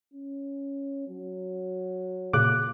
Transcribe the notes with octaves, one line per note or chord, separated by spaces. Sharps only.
C#4
F#3
A#2 C#3 A#3 D6 F#6